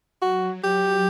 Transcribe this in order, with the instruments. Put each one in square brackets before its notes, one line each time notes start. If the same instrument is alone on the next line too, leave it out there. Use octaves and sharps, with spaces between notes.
[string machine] F#3 [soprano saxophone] F#4
[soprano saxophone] G4